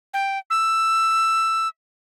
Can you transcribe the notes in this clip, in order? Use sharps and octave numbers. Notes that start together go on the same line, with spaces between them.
G5
E6